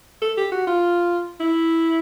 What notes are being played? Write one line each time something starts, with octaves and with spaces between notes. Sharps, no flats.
A4
G4
F#4
F4
E4